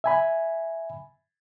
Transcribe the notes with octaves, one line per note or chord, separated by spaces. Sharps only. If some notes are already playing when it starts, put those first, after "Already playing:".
E5 G#5 B5